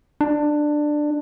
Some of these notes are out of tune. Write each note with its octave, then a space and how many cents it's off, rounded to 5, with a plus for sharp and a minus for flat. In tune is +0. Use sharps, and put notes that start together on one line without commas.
D4 +15